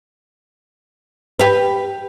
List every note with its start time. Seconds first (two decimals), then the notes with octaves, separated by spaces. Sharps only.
1.39 G4 B4